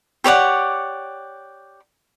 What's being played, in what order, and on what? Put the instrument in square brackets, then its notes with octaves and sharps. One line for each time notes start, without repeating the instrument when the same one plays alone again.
[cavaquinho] G4 C#5 D5 F#5